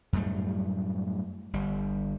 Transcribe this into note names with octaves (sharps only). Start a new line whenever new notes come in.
F#2 A2 G3 A3
G1 G3